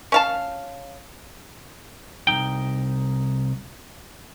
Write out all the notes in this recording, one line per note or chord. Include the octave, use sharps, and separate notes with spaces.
C#4 F5 A5
C2 B2 D#4 G5